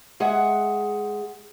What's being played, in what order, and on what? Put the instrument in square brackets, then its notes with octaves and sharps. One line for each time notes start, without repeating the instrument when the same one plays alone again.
[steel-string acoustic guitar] G#3 G#4 E5 F#5